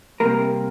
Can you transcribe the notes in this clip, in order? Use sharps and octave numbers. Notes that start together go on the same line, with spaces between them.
C3 G3 A#3 A#4